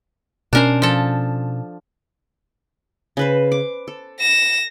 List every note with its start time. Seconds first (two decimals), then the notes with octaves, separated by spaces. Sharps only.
0.53 B2 C#4 D4 A#4 C5
0.82 F3 A4
3.17 C#3 B4 C5
3.52 D6
3.88 A4
4.20 A#6 E7